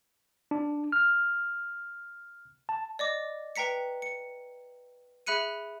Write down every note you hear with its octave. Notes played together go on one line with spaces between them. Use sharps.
D4
F6
A5
D5 D#5 D6
B4 G5 A#5 B6 C#7
C#7
G#4 E5 B5 F#6 C#7 D#7